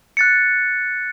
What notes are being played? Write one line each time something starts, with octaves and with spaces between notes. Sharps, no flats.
F#6 A6 C#7